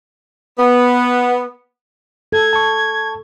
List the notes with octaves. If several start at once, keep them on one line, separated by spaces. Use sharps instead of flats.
B3
A4 G#6
A5 C#6